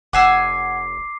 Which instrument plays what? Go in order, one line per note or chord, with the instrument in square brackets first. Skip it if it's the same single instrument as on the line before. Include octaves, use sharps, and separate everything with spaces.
[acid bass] F1 [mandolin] F#5 G#5 E6 [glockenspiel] D6 C7